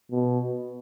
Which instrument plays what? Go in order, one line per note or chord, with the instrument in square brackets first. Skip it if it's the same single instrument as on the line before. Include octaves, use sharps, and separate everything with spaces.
[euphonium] B2